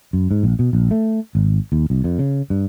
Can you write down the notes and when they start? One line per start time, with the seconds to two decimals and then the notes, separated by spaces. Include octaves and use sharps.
0.13 F#2
0.31 G#2
0.43 A#1
0.59 B2
0.73 A#1
0.91 A3
1.35 G#1
1.72 D#2
1.90 C2
2.04 F2
2.19 C#3
2.50 G2